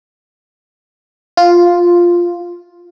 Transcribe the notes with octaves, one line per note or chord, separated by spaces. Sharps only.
F4